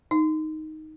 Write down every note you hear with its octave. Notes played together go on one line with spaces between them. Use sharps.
D#4